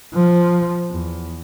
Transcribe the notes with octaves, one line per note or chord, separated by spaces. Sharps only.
F3
E2